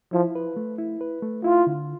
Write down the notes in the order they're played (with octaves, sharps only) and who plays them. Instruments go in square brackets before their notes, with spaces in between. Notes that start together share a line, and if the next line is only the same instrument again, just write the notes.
[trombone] F3 [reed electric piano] E4
[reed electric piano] B4
A3
E4
B4
A3
[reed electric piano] E4 [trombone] F4
[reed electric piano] D3